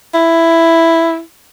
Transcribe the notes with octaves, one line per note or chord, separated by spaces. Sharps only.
E4